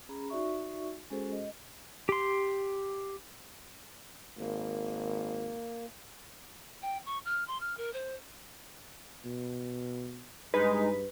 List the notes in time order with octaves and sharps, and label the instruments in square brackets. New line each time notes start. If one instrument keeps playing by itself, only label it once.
[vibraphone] C#4 G#4 A#5 B5
D#4 F#4 D5 E5 C#6
G#3 C#4 F#4 G#4 A4 C5
D#5
[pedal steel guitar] G4 C6
[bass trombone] G#1 [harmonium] A#3
[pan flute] G5
C#6
F6
C6
F6
A#4
C5
[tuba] B2
[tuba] G2 [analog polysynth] G#3 D#4 [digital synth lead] B4